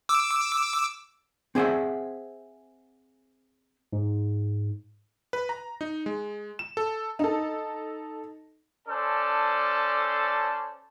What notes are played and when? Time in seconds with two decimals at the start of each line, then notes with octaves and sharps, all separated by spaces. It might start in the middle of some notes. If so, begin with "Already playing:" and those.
0.09 D6 E6
1.55 C4 G#4 C5 D#5 E5 F#5
3.93 G#2
5.33 B4
5.49 A#5
5.81 D#4
6.06 G#3
6.59 E7
6.77 A4
7.19 D#4 A4
8.88 C#4 A4 C5 D5 A5